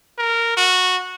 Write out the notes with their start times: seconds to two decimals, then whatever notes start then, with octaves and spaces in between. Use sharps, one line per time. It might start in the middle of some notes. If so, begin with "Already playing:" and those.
0.18 A#4
0.57 F#4